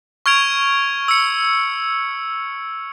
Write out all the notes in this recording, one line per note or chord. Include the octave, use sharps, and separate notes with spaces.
C#6 F6 G#6 D7 F7
E6 C#7